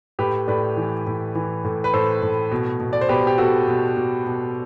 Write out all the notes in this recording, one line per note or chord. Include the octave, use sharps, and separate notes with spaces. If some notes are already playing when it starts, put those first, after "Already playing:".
A2 G4 B4
A2 B4 D5
E3
A2
E3
A2
B4
A2 A4 C5
A2
B2
B2
D5
C5
B2 G4 B4
G4
B2 F#4 A4
B2
B2
B2